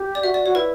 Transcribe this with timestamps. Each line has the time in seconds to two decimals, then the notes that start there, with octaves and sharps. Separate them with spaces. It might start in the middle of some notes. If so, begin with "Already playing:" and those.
Already playing: G4
0.15 D5
0.23 F#4 E5
0.34 D5
0.45 F#4 C#5
0.55 E4 B4